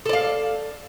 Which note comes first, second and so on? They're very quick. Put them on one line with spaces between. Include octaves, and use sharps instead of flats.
A4 D5 F5